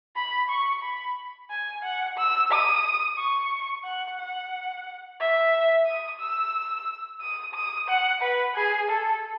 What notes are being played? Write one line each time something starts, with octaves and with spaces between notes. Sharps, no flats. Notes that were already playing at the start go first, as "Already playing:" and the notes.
B5
C#6
B5
G#5
F#5
E6
D#6
C#6
F#5
F#5
E5
D#6
E6
D#6
D#6
F#5
B4
G#4
A4